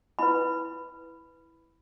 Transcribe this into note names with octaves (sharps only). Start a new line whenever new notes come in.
E4 B4 B5